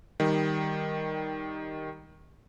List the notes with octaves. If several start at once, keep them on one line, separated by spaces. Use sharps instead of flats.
D#3 G3